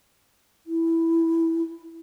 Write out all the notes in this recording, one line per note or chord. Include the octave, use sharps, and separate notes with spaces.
E4